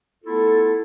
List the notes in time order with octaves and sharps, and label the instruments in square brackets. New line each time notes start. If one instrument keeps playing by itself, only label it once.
[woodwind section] A3 B3 E4 F4 A4